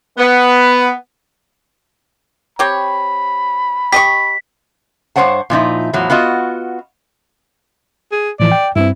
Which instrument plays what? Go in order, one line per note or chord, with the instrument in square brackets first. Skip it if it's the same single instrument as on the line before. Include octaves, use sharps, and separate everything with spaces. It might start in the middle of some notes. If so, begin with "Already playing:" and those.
[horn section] B3
[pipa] C4 G4 C#5 [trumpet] B5
[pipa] G4 D#5 C#6 [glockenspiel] B6
[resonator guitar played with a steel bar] G2 E3 C5 C#5 F#5 A5
A#2 F3 D#4 E4
E2 A2 F3 F#3
B3 F4 F#4 D#5
[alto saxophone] G#4
[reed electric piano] A2 E3 F3 [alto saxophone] D5
[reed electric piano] G5
[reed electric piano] G2 C4 [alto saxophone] E4